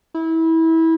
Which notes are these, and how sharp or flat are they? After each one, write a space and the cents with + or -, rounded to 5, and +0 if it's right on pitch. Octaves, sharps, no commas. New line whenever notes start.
E4 -25